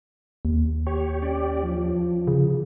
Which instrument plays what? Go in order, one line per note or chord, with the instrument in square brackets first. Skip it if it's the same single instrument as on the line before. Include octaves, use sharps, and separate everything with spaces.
[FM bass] D#2
[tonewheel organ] G4 C#5
C#4 G4 D5
F3
[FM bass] C#3